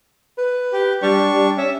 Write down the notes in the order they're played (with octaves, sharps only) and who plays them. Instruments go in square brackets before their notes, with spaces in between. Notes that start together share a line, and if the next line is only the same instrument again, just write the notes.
[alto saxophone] B4
[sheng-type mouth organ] G4
[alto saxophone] G3 [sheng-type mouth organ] D4 C#6
[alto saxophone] G3
[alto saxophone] C#4 [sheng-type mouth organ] E5